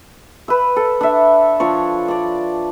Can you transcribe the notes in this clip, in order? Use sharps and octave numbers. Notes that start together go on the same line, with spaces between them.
B4 E6
A4
D4 E5
F3 D4 C#5
D4 D5